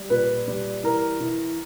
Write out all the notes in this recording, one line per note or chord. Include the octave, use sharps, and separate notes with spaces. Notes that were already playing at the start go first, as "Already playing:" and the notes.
Already playing: G3
A#2 B4
G3
E3 A#4
E3